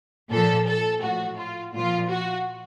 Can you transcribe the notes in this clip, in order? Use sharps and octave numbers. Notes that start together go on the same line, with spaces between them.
A#2 F3 A4
A4
A2 F3 F#4
F4
A#2 F3 F4
F#4